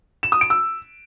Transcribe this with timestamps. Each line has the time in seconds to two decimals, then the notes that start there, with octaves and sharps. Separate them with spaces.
0.23 E7
0.32 D#6
0.41 D7
0.50 E6